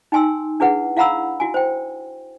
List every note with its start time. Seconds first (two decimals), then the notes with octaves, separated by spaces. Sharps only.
0.12 D#4 G5 G#5 C6 E6
0.60 D4 E4 G#4 B4 F#5
0.97 E4 F5 F#5 A#5 B5 E6
1.40 E4 F#4 G#5
1.54 C5 G5